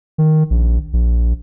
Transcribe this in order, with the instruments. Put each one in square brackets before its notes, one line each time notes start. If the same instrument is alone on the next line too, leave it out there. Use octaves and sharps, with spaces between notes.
[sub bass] D#3
A#1
A#1